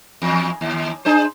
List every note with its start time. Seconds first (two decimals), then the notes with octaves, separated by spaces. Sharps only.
0.22 E2
0.61 D#2
1.05 D4 G#4 C5